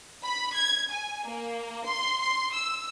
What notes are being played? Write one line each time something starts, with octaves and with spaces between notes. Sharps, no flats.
B5
G#6
G#5
A#3
C6
C6
E6